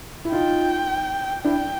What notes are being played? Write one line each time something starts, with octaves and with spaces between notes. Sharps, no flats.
E4
D#4 F4 G5
D4 E4 G5